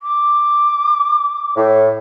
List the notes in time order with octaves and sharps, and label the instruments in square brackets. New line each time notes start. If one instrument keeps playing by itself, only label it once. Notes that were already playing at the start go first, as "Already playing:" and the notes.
[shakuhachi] D6
[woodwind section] A2